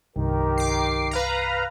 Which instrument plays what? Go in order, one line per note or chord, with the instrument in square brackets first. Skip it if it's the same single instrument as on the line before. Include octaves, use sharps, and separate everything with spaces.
[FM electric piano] C2 G2 [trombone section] D#3 G4 A#4
[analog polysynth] D6 C7
B4 F5 A#5